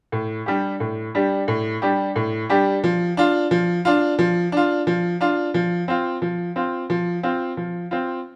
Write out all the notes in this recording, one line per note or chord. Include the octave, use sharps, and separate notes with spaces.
A2
G3 D4 G4
A2
G3 D4 G4
A2
G3 D4 G4
A2
G3 D4 G4
F3
D4 F4
F3
D4 F4
F3
D4 F4
F3
D4 F4
F3
C4 F4
F3
C4 F4
F3
C4 F4
F3
C4 F4